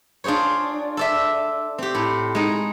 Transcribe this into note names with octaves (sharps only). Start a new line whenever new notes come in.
D4 F4 G#4 C5 C#5
A4 D5 E5
C4 G4
A2
G#3 D#4